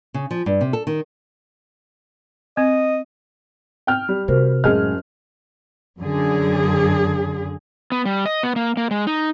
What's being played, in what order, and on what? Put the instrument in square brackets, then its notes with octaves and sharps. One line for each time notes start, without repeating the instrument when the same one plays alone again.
[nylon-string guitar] C#3
F3
G2
C3
A4
D#3
[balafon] C4 [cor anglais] D#5
[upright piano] G5 F6
G3
[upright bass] C3 [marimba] F#4 A#4 C5
[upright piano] F#1 G#4 F6 [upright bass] A2 G#3 [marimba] D#5
[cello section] F#2 D3 G#4
[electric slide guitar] B3
G3
D#5
B3
A#3
A#3
G#3
D#4